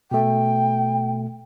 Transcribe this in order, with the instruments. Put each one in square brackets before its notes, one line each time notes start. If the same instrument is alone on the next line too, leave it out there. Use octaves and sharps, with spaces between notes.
[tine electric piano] B2 A3 [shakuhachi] G5